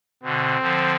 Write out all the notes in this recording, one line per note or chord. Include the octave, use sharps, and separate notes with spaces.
B2 D3 C4
D3 F3